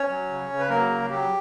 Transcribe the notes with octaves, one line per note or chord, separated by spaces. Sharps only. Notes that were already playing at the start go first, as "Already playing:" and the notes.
Already playing: C#4 C#5
F#3
C#3
C#3
B4
F#3 A#3 A#4
C#3
F#3 G4